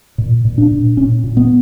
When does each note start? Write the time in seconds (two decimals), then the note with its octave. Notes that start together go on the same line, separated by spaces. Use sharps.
0.18 A#2
0.45 A#2
0.58 D4
0.72 A#2
0.97 A#2 C#4
1.24 A#2
1.37 B3